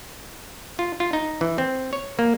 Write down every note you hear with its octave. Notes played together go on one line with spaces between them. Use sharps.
F4
F4
D#4
E3
C4
C#5
A#3